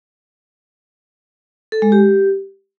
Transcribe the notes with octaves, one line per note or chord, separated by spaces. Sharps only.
A4
G#3
G4